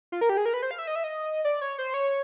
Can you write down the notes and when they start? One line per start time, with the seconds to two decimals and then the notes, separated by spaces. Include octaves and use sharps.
0.12 F4
0.21 A#4
0.29 G4
0.37 G#4
0.45 A#4
0.54 B4
0.62 C5
0.71 F5
0.78 E5
0.87 D#5
0.95 E5
1.04 D#5
1.45 D5
1.61 C#5
1.78 C5
1.94 C#5